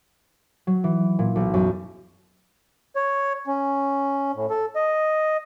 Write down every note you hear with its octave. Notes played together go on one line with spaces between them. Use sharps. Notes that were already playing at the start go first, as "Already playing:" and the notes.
F#3
E3
A#2
B1
F#2
C#5
C#4
A2
A4
D#5